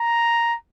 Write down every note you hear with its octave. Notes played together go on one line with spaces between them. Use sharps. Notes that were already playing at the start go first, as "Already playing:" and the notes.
Already playing: A#5